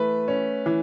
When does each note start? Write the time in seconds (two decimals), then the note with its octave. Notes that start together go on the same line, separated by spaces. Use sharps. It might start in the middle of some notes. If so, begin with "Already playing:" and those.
Already playing: E3 A3 B4
0.28 C#4
0.66 E3